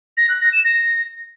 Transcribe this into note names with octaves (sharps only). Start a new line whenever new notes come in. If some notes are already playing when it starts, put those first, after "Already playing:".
A#6
F#6
A#6
E7
A#6